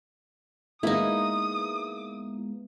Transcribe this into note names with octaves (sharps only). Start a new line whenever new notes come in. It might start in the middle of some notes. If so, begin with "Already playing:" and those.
G#3 A#3 B3 D#4 E4 D#6